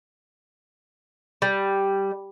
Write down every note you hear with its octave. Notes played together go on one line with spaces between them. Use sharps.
G3